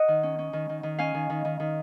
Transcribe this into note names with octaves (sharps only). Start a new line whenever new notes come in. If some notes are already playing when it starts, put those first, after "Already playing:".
Already playing: D#5 F#5
D#3
C#4
C#4
D#3
D#3
D#3
C#4 F5 G#5
D#3
D#3
D#3
D#3